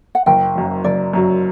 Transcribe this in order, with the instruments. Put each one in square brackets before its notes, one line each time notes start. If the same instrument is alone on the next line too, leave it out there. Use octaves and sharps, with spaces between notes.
[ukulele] F#5
[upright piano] F#1 [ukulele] G5
[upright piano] F#2 F#3
[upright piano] F#1 [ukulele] D5
[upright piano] F#2 F#3